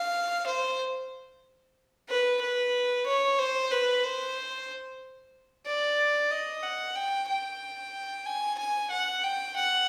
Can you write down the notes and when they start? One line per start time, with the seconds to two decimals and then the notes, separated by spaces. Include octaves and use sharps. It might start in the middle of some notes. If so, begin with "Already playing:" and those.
Already playing: F5
0.47 C5
2.09 B4
2.41 B4
3.06 C#5
3.39 C5
3.72 B4
4.04 C5
5.66 D5
6.31 D#5
6.63 F#5
6.96 G5
7.29 G5
8.26 G#5
8.59 G#5
8.91 F#5
9.24 G5
9.56 F#5